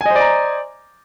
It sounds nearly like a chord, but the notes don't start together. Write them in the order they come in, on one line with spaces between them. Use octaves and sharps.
G#5 D#5 C5 D5 A#5